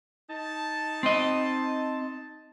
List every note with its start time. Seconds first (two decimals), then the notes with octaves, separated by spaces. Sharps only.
0.30 D#4 A5
1.03 C4 D#5